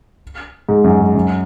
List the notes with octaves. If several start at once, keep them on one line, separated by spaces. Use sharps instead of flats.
G#2
F#2
G#2
F#2